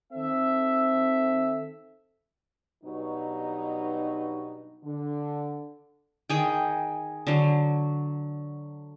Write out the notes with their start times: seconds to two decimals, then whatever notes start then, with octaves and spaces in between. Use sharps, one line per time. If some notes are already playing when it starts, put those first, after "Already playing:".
0.13 D#3 C4 A4 E5
2.84 G2 B2 F#3 D#4
4.83 D3
6.29 D#3 G#4 G5
7.27 D3 F#3